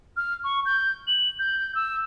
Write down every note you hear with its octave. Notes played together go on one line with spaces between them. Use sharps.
F6
C#6
G6
F#7
G6
E6